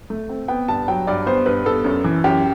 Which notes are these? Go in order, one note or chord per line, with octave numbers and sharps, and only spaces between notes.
A3
C4
B3 G5
G2 A5
F#3 G5
G2 D5
B3 C5
G2 B4
B3 A4
F#2
E3
F#2 G4